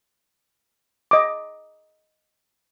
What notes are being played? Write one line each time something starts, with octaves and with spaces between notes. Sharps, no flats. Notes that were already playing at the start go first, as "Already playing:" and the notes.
D#5 D6